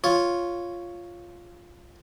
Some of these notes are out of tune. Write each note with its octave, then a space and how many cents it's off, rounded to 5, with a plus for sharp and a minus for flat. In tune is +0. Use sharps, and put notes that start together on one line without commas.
F4 +0 C#5 +0